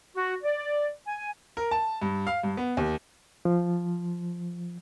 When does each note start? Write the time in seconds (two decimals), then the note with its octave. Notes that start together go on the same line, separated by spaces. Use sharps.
0.15 F#4
0.43 D5
1.06 G#5
1.57 A#4
1.71 A5
2.02 G2
2.27 F5
2.43 G2
2.57 B3
2.77 D#2
3.45 F3